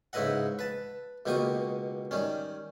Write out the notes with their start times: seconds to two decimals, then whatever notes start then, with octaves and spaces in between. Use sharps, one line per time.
0.13 G#2 C#3 E4 B4 D#5 F#5
0.59 B4 A5
1.26 C#2 B2 A#3 G4 C#6 D#6
2.11 D#3 G3 C#4